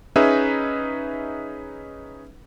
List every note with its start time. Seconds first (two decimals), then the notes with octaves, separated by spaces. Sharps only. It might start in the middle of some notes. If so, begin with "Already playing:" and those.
0.16 C#4 D#4 G#4 B4 E5